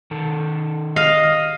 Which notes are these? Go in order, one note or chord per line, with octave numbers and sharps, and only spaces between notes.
D#3 A4
D#5 F5